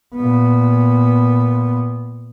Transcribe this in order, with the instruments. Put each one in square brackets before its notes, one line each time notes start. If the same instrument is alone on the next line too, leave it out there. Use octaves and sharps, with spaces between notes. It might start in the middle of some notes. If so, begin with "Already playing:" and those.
[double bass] A#2 B3